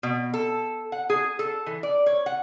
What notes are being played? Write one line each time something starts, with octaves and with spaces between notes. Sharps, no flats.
B2
A4
F#5
G#4
A4
E3
D5
C#5
F#5